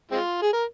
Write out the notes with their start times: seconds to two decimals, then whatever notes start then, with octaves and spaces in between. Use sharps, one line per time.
0.11 G#3 C4 F4
0.42 G#4
0.53 A#4